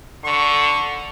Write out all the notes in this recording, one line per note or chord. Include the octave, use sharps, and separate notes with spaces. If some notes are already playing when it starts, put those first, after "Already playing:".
D3 C#6